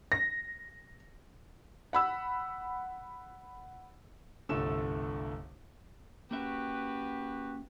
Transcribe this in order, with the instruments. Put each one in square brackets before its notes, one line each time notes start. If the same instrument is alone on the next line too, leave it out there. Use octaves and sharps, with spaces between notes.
[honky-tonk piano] A#6
[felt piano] F#5 B5 E6
[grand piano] G1 C2 D3 A3 E6 E7
[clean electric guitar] A#3 C#4 E5 [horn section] F#4 G4 B4